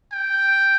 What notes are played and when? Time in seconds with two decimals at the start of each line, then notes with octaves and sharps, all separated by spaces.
0.12 G5